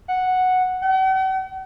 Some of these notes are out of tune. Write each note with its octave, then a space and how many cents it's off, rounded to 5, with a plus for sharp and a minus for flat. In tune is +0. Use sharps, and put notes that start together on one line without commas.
F#5 -5
F#5 +45